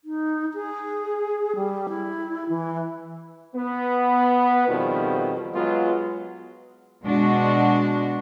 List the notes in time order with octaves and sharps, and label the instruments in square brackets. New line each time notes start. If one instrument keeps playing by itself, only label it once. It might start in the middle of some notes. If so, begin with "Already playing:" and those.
[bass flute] D#4
G#4
G3
E4
E3
[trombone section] B3
F2 B2 D#3 F3 G3
F#3 G#3 B3 F4
[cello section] B2 G#3 D4 F#4